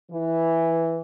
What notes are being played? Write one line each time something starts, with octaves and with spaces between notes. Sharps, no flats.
E3